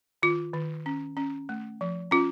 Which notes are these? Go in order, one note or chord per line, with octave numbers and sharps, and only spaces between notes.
D#3 F4
D#3
C#4
C#4
A3
F3
C#4 F4